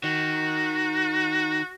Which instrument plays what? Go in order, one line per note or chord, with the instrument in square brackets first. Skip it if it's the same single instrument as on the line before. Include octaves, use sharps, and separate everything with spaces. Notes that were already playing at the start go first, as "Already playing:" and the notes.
[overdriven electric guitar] D#3 [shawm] F#4